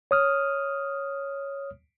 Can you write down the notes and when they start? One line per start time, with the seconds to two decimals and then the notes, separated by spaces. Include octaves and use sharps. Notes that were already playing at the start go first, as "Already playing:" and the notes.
0.11 C#5 D#6 F6